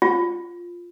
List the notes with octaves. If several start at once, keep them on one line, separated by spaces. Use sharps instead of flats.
F4